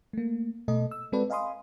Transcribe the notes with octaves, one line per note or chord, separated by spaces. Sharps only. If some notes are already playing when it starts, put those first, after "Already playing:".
A3 A#3
B2 A3 A4 D#5
E6
G#3 C4 F#4 A4 B4 D5
D#5 F5 G#5 B5 C6 D#6